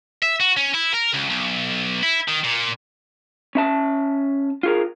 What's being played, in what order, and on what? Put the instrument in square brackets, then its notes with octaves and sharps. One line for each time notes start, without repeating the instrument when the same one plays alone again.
[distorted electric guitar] E5
F#4
C#4
E4
A#4
C#2
B1
E4
D#3
A#2
[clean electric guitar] C#4 E5 A5
F4 G#4 A#4